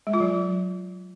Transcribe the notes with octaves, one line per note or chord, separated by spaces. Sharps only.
G#3
F4
F#3